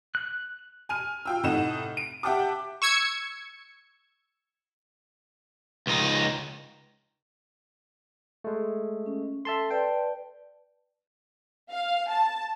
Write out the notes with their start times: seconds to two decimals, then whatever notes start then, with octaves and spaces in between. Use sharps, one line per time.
0.15 F#6
0.89 G#5 F6 D#7
1.26 F4 G5 E6
1.44 A2 C3 D#4 F#5 E7
1.97 D7
2.23 G4 E5 F#5 G5 A5 D6
2.82 C#6 E6 G#6 C#7
5.87 C#2 D#4
8.44 G#3 A3
9.06 C#4
9.45 A4 E5 A5 C6
9.71 B4 D5 G5 A5
11.71 F5
12.10 A5